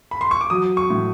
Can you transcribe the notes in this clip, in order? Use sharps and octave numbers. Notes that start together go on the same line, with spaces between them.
B5
C6
C#6
D6
F#3 D#6
C#6
A2